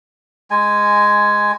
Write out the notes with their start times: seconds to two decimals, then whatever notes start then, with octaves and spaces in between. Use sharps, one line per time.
0.51 G#3 G#5